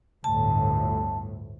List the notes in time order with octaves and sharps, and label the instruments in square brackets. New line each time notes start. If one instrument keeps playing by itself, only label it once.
[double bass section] G1 D2 A2 [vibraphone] A5